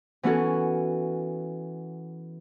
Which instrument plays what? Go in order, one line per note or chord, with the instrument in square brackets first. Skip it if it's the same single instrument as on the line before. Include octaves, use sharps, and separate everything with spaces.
[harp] E3 B3 C#4 F#4 A4